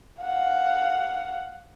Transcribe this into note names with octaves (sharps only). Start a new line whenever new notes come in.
F5 F#5